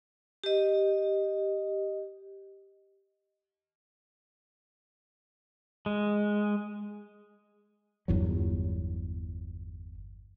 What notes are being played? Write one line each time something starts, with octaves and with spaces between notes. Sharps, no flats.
G4 D#5
G#3
G1 E2 F#3